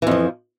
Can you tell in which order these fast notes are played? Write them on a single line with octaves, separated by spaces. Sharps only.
E3 F2 F3